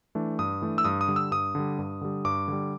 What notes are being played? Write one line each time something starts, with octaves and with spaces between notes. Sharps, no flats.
E3 A3 D4
G2 D#6
E3 A3 D4
E6
G2 D#6
D#6
D3 G3
E6
G2 D#6
D3 G3
G2
D3 G3
G2 D6
D3 G3